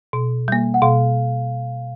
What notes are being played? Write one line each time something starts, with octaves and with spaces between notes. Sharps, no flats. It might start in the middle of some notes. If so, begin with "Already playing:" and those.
B2
G3 A#3
F#5
B2 F5